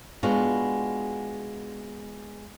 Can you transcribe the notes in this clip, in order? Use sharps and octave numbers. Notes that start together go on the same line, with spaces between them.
G#3 B3 D4 F4 F#4